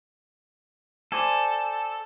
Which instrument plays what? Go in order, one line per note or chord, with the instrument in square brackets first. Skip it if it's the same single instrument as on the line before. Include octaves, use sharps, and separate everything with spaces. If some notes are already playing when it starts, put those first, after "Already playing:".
[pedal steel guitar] A4 [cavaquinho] C5 D5 G#5